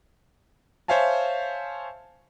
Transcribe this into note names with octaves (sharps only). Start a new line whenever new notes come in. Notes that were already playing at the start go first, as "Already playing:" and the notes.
C5 C#5 E5 F5 G#5 A5